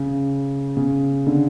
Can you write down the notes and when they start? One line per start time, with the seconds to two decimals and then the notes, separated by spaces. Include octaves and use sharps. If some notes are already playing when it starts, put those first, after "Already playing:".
Already playing: C#3
0.77 C#3
1.27 D3